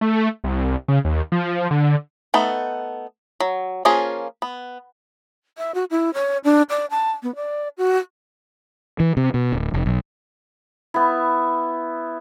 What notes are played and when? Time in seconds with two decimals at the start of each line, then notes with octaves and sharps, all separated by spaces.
0.01 A3
0.44 C2
0.88 C#3
1.05 D#2
1.32 F3
1.71 D3
2.34 A3 B3 D#4 A4
3.40 F#3
3.85 F3 A#3 C#4 F4 G#4
4.42 B3
5.58 E5
5.75 F#4
5.91 E4
6.14 C#5
6.44 D4
6.70 D5
6.90 A5
7.23 B3
7.36 D5
7.78 F#4
9.00 E3
9.17 C3
9.34 B2
9.52 D1
9.74 F1
9.86 B1
10.94 B3 E4